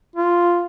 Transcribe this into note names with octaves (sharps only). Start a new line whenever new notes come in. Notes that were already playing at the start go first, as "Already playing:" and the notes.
F4